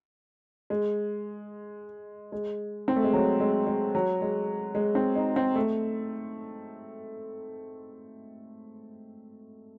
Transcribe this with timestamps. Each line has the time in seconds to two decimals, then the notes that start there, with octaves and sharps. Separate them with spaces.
0.70 G#3
2.32 G#3
2.88 C4
2.96 A3
3.04 G#3
3.13 F#3
3.40 G#3
3.67 G#3
3.95 F#3
4.22 G#3
4.75 G#3
4.95 C4
5.16 D#4
5.36 C4
5.56 A3